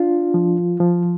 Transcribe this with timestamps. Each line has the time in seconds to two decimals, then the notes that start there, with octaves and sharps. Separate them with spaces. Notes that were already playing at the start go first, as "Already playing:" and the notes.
Already playing: D4 F4
0.34 F3
0.80 F3